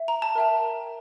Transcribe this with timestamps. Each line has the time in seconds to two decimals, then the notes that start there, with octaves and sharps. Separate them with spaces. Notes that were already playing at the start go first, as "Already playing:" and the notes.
Already playing: E5
0.08 A#5
0.22 A5
0.35 A#4 E5 G5